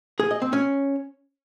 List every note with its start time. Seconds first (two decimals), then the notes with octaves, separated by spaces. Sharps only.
0.20 G#4
0.31 D#5
0.42 C4
0.53 C#4